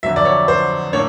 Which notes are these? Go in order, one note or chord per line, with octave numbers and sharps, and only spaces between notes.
F2 D3 F#3 E5
D5
C#5
C5
A2 A#3 D4 C#5